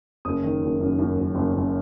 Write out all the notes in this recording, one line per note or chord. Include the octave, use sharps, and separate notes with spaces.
F#1 D#6
D#3
F#1
F#2
F#2
F#1
F#1
F#1